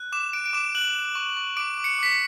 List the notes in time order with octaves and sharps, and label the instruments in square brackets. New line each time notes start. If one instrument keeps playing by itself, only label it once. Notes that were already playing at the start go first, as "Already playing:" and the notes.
Already playing: [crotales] F#6
D6 E7
F#6 D7
D7
D6 E7
F#6 F#7
F#6
C#6
C#6
D6 D7
D6
C#7
D6 B6
C#7